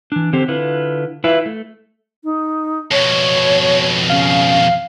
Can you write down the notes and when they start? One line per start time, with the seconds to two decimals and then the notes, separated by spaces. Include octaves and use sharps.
0.12 E3 D4
0.33 D3 C4 G4 C5
0.48 D3 E4 F4 B4
1.24 E4 F4 B4 E5
1.46 A3
2.24 D#4
2.91 F2 B2 C#5
4.09 C#3 F5